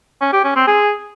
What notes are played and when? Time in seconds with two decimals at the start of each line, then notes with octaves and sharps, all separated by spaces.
0.21 C#4
0.33 G4
0.44 C#4
0.56 C4
0.68 G#4